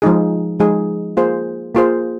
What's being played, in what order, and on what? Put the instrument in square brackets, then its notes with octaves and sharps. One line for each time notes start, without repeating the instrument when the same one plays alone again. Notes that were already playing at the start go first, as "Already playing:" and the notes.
[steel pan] F3 G#3 D#4 G#4
F3 G#3 D#4 G#4
A#3 F4 G#4 C5
A#3 F4 G#4 C5